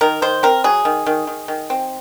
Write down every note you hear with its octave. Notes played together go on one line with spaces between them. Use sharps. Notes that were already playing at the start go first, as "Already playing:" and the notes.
D#3 A#4
D#3 C5
C4 A#4
F#3 G#4
D#3
D#3
D#3
D#3
C4